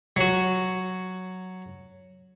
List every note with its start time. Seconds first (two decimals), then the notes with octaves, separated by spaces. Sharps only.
0.16 F#3 F#4